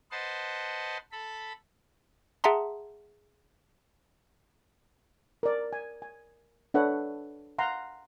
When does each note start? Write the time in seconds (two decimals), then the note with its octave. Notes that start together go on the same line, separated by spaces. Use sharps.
0.11 B4 C5 D#5 F#5 A5 C6
1.12 A4 B5
2.44 G#4 E5 F#5 A5 A#5 C6
5.43 A#4 D5
5.73 G#5
6.02 G#5
6.74 D4 A4 B4 C#5 E5 F#5
7.59 F5 F#5 A#5 C6